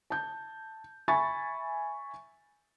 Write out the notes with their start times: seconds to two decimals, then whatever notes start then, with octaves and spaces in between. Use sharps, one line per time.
0.10 A5 G6
1.08 E5 G#5 B5 C#6 A6